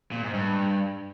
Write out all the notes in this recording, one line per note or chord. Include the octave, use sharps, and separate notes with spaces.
A#2
G#2
G2